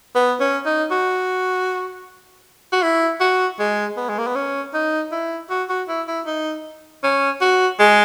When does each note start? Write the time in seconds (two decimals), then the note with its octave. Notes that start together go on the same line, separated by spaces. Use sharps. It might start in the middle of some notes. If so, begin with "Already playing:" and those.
0.15 B3
0.40 C#4
0.66 D#4
0.91 F#4
2.73 F#4
2.83 E4
3.21 F#4
3.59 G#3
3.97 B3
4.09 G#3
4.18 A#3
4.27 B3
4.35 C#4
4.74 D#4
5.12 E4
5.50 F#4
5.69 F#4
5.88 E4
6.08 E4
6.26 D#4
7.04 C#4
7.41 F#4
7.79 G#3